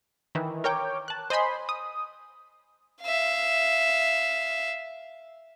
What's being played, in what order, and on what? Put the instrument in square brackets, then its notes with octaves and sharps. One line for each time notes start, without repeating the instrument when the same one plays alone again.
[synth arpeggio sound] D#3 E3
A#4 C#5 G5 D6
A5 F#6
C5 D#5 G#5 B5 C6
D#6
[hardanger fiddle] E5 F5